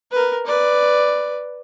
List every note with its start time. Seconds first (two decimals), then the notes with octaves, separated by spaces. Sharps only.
0.11 A#4 B4
0.46 B4 D5